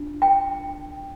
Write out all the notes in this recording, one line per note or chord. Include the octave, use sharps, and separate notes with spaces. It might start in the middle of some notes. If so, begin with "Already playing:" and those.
Already playing: D4 F4
G5